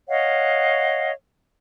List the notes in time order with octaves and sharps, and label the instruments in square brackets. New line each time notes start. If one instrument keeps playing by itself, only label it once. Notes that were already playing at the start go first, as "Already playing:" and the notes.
[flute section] C#5 D#5 F5 F#5